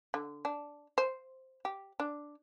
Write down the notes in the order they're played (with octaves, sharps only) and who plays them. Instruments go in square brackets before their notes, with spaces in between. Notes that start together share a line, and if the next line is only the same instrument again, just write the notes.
[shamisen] D3
D4
C5
G4
D4